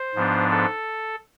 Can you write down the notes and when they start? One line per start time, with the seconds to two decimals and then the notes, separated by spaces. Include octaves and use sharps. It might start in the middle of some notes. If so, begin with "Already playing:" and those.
Already playing: C5
0.15 G#2 F3 B3 D4
0.50 A4